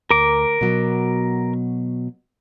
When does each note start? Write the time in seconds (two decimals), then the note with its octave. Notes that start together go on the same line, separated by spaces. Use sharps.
0.11 D2 A#4 D6
0.61 B2 F#3